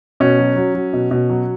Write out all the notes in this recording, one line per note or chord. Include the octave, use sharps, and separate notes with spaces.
B2 C#4
F#3
F#3
F#3
B2
B2
F#3